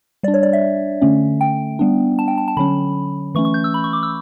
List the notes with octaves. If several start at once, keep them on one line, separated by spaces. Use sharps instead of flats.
G3 D4 D5
C#5
D5
E5
D3 A3 C#4
G5
G3 B3 D4
A5
G5
A5
A5
D3 F#3 C#4 B5
E3 A3 C#4 C#6
C#6
G6
E6
B5
C#6
D6
E6